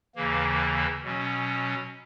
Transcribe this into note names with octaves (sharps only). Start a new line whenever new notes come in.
D#2 C#3 E3 A#3
B2 F#3 C#4